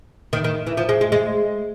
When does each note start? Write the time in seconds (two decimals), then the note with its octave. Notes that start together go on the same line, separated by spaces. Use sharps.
0.33 D#3
0.44 D#3
0.67 E3
0.77 F3
0.89 G#3
1.01 G#3
1.12 G#3